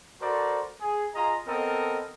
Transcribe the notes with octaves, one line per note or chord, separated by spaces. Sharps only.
F#4 A4 A#4 C5 D5
G#4
F4 G#4 D#5 A#5
B3 C4 A4 A#4 D#5